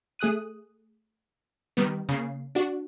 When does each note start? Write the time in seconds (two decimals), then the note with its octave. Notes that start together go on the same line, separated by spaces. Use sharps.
0.19 A3 G#4 D#6 F#6 D#7
1.77 D#3 G3 B3
2.09 C#3 A#3 C7
2.55 D4 F#4